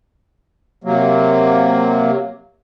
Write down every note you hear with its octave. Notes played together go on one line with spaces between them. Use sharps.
C3 F#3 A#3